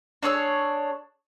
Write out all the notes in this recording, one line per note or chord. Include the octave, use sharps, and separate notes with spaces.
D4 G#4 C#5 E6